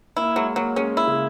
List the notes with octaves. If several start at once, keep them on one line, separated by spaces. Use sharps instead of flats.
A#3 E4
F#3 G#3
F#3 A#3
G#3 C#4
E4
C#3